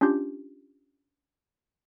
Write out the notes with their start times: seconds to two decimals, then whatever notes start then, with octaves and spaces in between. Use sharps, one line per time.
0.01 C#4 D4 F4 G4 G6